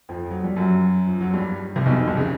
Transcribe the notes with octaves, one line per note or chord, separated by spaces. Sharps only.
F2 F3
F#3
G3
F#2 F#3
F3
F#3
G2 G3
C2 C3
B1 B2
B1 B2
C2 C3
C#3